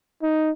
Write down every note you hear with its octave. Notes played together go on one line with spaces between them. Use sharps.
D#4